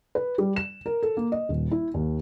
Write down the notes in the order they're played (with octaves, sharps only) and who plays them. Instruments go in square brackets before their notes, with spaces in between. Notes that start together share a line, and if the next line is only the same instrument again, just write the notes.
[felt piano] B4
G3
E7
A#4
A4
A#3
D#5
D#1
E4
D#2